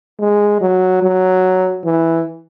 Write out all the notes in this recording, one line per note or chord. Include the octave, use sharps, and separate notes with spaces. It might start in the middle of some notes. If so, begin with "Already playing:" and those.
G#3
F#3
F#3
E3